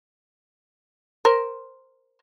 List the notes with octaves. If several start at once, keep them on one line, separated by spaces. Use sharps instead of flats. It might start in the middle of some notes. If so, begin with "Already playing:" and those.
A#4 C5